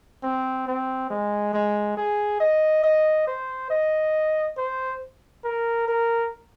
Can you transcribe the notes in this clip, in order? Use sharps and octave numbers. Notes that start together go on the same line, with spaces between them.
C4
C4
G#3
G#3
G#4
D#5
D#5
C5
D#5
C5
A#4
A#4